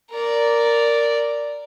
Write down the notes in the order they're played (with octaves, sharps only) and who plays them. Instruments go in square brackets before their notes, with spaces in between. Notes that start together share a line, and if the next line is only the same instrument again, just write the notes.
[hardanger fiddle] A#4 D5